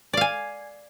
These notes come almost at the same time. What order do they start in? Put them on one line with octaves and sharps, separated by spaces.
D5 F5 G#5